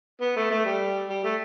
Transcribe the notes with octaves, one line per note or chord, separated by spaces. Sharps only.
B3
A3
A3
G3
G3
A3